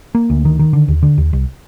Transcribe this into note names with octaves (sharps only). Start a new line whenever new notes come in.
A#3
D2
D#3
D#3
D3
D#2
D3
D#2
C2